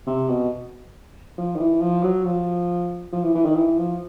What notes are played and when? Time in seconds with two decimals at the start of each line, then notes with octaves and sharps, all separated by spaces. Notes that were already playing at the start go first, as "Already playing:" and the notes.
0.07 C3
0.29 B2
1.38 F3
1.56 D#3
1.60 E3
1.81 F3
2.03 F#3
2.25 F3
3.13 F3
3.23 E3
3.35 E3
3.45 D#3
3.56 E3
3.78 F3